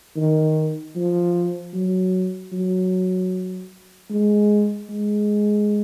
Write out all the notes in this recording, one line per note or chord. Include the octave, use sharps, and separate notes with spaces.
D#3
F3
F#3
F#3
G#3
G#3